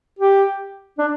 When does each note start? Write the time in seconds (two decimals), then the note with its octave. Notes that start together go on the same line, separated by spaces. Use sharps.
0.19 G4
0.98 D4